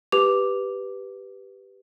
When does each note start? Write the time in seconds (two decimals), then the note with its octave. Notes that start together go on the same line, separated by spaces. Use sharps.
0.12 G4 B4 D6 F7